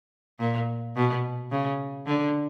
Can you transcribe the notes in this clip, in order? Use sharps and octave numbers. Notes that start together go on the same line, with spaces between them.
A#2
B2
C#3
D3